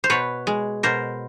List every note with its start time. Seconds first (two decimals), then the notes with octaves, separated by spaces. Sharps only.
0.04 C5
0.10 B2 B4 C#5
0.47 G#3
0.83 B2 A#4 C5